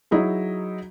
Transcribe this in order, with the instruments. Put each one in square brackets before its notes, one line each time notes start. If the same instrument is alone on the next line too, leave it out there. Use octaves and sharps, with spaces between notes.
[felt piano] F#3 D#4 E4 G#4